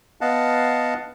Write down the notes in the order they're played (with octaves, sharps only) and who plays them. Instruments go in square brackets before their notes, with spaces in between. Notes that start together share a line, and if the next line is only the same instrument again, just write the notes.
[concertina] B3 D#5 F5 F#5 A5